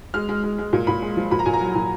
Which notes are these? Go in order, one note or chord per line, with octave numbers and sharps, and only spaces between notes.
G#3 F6
G#3
G#3
G#3
A#2
A#2 B5
G#3
F3
A#2 B5
A#5
A#2 G#5
A#5
F#3
A#2